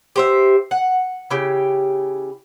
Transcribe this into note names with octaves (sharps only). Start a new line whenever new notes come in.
G4 C5 E5
F#5
C#3 E4 G4 G5